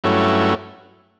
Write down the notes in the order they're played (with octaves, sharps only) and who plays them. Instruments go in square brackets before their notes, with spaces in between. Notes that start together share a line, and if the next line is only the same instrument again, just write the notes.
[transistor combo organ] G2 F#3 A3 C#4 E4